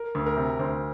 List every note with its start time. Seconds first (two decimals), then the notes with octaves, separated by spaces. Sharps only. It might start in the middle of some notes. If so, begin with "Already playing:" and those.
Already playing: A#4
0.15 D2
0.26 A#4
0.37 C3
0.59 D2 C5